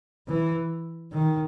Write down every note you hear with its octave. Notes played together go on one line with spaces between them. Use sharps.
E3
D#3